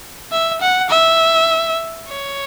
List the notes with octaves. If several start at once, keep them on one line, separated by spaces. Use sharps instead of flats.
E5
F#5
E5
C#5